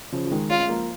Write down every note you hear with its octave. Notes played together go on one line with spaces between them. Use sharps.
C#3 F3
F3
D#3 G#3
G#3 C#4 F4
G#3
F3 A#3